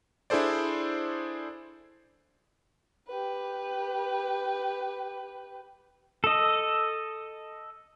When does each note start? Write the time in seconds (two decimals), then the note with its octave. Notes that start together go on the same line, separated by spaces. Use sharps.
0.30 D4 E4 G#4 A4 C5 D5
3.08 G4 B4
6.24 A4 D#5